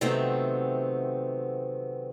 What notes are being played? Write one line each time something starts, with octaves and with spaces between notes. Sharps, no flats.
C3 D#3 F#3 A3 B3 C4